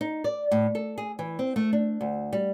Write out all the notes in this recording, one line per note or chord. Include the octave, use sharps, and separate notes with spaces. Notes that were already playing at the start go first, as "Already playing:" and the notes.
D#4
D5
A2
A4
G#4
E3
C4
A3
D4
D2
G3